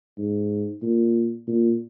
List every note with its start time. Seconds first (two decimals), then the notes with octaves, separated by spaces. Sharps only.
0.18 G#2
0.82 A#2
1.47 A#2